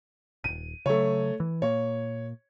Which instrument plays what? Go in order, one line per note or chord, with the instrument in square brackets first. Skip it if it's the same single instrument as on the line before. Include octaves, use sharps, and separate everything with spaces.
[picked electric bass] D#1 G#1 [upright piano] D#7
[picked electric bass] C#3 F#3 [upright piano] A3 C#5
[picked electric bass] E3
[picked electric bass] A#2 A#3 [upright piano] C#5